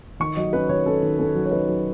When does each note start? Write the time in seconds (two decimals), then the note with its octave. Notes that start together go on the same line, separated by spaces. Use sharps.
0.20 D#3 C#6
0.37 F#3 D#5
0.53 C#4 B4
0.69 D#3 C#5
0.86 C#4 A4
1.03 D#3
1.19 C#4 A4
1.35 F#3
1.45 C#5
1.51 D#3 B4
1.69 F#3